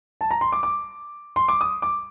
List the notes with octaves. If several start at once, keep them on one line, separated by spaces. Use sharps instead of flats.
A5
A#5
C6
D6
D6
C6
D6
D#6
D6